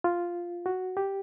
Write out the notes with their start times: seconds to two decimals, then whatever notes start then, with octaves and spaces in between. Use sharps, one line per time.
0.04 F4
0.66 F#4
0.97 G4